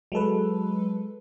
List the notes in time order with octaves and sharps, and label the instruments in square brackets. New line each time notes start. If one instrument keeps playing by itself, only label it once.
[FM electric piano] F#3 G#3 A4 B4